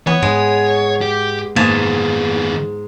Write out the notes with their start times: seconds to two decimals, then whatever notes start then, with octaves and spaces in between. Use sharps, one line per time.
0.07 E3 B3 C#5
0.22 G#2 G#3
1.01 G4
1.56 G#2 D#3 A#3 B3 G#5 A5